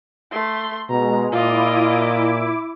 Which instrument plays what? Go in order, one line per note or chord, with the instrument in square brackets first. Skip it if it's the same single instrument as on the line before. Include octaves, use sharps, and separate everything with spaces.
[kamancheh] A3 C6
[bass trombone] B2 [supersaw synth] G#3 [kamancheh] A#5
[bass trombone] A#2 [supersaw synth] E4 D6 [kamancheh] F4 D#5